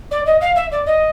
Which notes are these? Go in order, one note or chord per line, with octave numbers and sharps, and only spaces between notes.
D5
D#5
F5
E5
D5
D#5